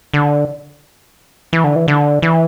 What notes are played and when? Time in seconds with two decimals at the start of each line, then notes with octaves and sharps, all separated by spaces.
0.14 D3
1.53 E3
1.64 D3
1.76 E3
1.88 D3
2.22 E3